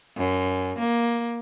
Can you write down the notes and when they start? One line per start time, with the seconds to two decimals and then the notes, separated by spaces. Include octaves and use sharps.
0.17 F#2
0.79 A#3